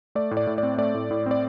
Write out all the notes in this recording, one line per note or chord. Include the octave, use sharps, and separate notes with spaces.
A3 D5
A2
D5
A2
D5
C4
A3 D5
A2
A2
C4 D5